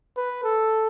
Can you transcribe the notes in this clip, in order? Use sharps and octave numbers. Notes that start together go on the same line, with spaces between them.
B4
A4